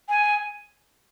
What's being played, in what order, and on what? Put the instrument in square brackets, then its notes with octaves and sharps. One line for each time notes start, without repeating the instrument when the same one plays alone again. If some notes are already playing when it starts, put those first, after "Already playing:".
[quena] G#5